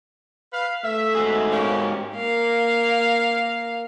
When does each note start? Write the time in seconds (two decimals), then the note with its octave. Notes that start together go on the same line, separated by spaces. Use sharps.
0.53 B4 F5
0.85 A3 E5
1.15 G#2 F#4 G#4
1.52 A#3 C#4 G4
2.15 A#3 F5